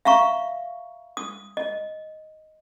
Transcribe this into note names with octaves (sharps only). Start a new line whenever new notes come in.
E5 F5 A#5 C#6
D#6
D#5